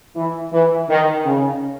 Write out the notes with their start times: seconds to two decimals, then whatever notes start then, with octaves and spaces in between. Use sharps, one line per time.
0.15 E3
0.52 E3
0.89 D#3
1.25 C#3